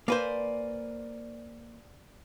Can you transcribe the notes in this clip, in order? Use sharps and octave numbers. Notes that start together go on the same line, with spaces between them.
A#3 B4 C5 D5 G#5